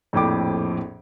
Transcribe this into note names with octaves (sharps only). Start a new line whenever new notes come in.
A#1 F2 A2 G5 D6